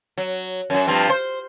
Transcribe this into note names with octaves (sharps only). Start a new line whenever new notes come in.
F#3
F#2 F#3
G2 F3 C4
C5